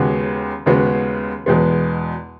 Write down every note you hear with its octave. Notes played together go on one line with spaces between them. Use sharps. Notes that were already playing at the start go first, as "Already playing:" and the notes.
Already playing: D#2 C#3 G#3 B3 F#4
D#2 C#3 G#3 B3 F#4
E2 B2 G#3 B3